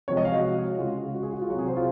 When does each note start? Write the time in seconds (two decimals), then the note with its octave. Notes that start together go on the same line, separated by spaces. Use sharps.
0.08 C3 F3 G#3 C#5
0.17 D#5
0.25 F5
0.34 F#4
0.78 C#3 G#3 F4
1.14 F#4
1.23 G#4
1.33 F#4
1.41 F4
1.50 F#3 F#4
1.54 C3 G#4
1.68 C5
1.76 F4